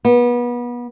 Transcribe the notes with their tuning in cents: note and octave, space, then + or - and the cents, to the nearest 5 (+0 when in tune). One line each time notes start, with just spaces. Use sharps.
B3 -30